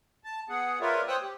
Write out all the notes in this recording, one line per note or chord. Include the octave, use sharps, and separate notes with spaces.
A5
B3 G#4 F#5
F4 A#4 B4 C#5 D5 E5
C5 C#5 G5 D#6 E6 F#6
G4